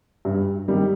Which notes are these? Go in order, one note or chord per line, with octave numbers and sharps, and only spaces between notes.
G2
D#3 G3 A#3